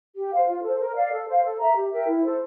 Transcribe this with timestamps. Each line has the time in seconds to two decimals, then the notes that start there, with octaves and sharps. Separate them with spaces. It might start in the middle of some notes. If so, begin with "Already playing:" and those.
0.16 G4
0.32 C5 F5
0.48 F4
0.63 A4 C5
0.79 A#4
0.95 D5 F5
1.12 A4
1.27 C5 F5
1.44 A4
1.59 E5 A#5
1.75 G4
1.91 A#4 E5 G5
2.07 E4
2.23 A4 C5